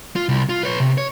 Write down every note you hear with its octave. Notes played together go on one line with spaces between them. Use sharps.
F4
C2
F4
B4 C#5
C3
C#5